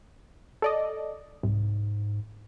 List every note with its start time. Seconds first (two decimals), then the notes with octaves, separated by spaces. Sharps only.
0.62 A4 D5 D#5
1.43 C2 G#2